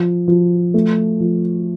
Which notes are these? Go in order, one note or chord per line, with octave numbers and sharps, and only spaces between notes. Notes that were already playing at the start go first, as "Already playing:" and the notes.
Already playing: F3
F3
A3
F3